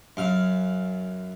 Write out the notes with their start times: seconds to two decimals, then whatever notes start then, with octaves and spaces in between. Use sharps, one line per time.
0.17 F#2 F5